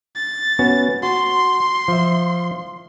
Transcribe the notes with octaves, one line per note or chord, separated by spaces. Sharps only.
A6
B3 C#4 F#4
F#4 C6
F3 E5